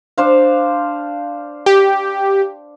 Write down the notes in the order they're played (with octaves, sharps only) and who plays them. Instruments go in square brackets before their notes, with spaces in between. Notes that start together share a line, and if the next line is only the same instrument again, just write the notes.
[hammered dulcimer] D4 C5 F5
[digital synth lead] G4